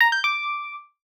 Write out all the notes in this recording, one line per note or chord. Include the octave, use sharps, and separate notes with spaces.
A#5
G6
D6